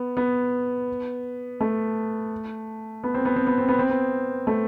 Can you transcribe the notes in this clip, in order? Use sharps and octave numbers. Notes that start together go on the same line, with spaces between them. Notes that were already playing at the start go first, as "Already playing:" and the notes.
Already playing: B3
B3
A3
B3
C4
B3
C4
B3
C4
B3
C4
B3
A3